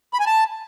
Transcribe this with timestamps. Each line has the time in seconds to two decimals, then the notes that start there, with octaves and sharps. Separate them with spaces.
0.14 B5
0.20 G#5
0.26 A5